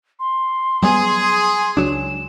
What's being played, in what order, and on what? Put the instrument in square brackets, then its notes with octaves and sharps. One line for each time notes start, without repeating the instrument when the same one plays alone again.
[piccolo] C6
[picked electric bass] F#3 G3 B3 [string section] G#4
[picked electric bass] C#2 F#3 D4 [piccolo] E7